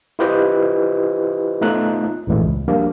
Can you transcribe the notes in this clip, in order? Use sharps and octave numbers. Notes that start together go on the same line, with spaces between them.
E4 F4 G4 B4 C5 D#5
A3 B3 D#4 F4 F#6
A#1 F#2 A2 E3 G#3 A3
C#2
F3 G3 A#3 D4